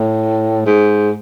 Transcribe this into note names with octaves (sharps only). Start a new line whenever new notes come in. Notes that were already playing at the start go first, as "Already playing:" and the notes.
Already playing: A2
G#2